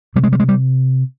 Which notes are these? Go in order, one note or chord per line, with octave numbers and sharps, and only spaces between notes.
C3 G3
G#3
G3
G#3
G3